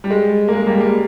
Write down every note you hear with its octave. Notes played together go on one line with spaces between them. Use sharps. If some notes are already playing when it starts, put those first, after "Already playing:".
G3
G#3
A#3
G#3
G3 A#3
G3 A#3